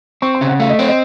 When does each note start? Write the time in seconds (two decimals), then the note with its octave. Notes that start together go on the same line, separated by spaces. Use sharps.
0.22 C4 C#6
0.35 C6
0.41 C#3
0.47 F#5
0.60 A3 F5
0.69 D#5
0.78 C4 C#5
0.88 D#5